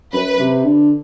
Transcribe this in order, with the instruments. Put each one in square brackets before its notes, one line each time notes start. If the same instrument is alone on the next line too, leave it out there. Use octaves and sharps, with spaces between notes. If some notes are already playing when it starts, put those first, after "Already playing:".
[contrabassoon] F#2 [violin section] B4
[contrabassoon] C3
D3